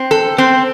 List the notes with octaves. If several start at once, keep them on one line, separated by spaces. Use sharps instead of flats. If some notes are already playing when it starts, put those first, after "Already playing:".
Already playing: C4
A4
C4